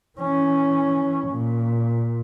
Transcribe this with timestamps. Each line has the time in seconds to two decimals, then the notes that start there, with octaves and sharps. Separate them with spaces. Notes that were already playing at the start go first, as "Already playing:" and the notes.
0.18 E3 C#4
1.29 A#2